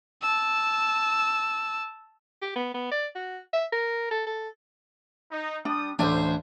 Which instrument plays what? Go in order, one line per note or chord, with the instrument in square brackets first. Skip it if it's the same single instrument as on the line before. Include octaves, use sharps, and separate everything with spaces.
[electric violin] A5 E6
[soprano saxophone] G4
B3
B3
D5
F#4
E5
A#4
A4
A4
[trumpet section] D#4
[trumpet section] G3 D#6 [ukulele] D4
[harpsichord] A1 D2 G#5 [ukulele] D4 [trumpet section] C5